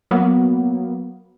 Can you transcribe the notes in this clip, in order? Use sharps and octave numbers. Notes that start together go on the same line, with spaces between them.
F#3 A#3 B3